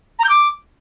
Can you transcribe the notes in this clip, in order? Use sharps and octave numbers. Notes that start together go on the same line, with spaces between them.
A#5
G6
D6